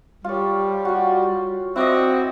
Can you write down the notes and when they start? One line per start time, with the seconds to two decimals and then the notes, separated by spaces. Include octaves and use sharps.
0.24 G3 F4 C#5
0.85 F4 F#4
1.76 C4 E4 F#4 D5 D#5